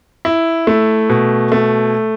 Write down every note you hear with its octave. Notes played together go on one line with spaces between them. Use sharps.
E4
A3
B2
A3